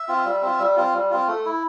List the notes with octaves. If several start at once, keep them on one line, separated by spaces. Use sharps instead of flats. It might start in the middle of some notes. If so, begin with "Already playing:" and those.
Already playing: E5
C4 F4
G3
C4 F4
G3
C4 F4
G3
C4 F4
A3
E4